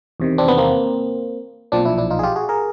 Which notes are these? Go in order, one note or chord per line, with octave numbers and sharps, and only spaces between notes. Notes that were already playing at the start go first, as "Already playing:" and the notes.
E2 C3 D#3
C4 D4
B3
A#3 C4
B1 A#2 F3 C4 D4
D4 E4
D4 E4
D#4 F4
G#4
F4 G4
F#4 G#4
G#4 A#4